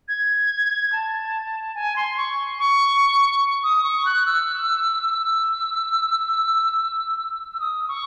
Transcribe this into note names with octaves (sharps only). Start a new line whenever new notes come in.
G#6
A5
G#5
C6
C#6
C#6
D#6
C#6
F#6
E6
E6
E6
D#6
C#6